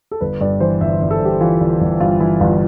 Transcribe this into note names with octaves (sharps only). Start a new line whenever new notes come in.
A4
G1 B4
G2 D5
E3 C5
G1 E5
G1
A4
G2 G4
E3 F4
G1
G1
G2 F4
E3 E4
G1 F4